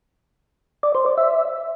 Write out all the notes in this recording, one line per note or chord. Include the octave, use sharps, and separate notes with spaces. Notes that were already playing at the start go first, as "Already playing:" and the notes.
D5
C5
D5
E5